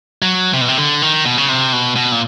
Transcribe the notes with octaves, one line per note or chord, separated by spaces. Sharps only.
F#3
C3
B2
C3
D3
D#3
B2
C#3
C3
B2
B2
A#2